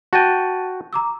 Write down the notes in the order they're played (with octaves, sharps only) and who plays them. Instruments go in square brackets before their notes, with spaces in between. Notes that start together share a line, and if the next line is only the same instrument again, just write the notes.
[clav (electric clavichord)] F#4 G5 [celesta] A5 A6 D#7
[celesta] A#5 D6 E6